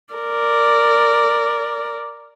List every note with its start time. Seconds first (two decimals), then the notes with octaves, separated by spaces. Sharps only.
0.14 A#4 D5